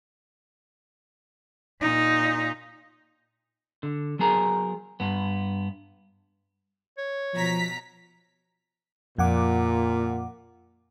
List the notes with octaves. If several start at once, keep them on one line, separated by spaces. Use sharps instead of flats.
A#2 D#4
D3
F#3 B3 G#4 A#4
G2 B3
C#5
B2 F3 A#5 B6
F2 A#2 F#5 D6